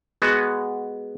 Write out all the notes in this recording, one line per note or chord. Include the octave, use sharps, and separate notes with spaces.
G#3 B3 F#4